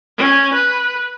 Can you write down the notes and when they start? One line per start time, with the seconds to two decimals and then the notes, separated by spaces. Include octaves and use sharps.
0.18 C#4
0.53 B4